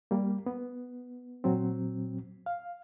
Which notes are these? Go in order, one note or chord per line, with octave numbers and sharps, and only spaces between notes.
G3 A#3
B3
A#2 F#3 C4
F5